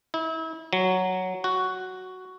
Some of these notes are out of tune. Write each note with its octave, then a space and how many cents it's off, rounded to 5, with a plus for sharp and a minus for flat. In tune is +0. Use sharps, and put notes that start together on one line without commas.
E4 -35
F#3 +0
F#4 +5